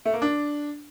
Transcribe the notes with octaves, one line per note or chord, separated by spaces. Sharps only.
A3
A#3
D4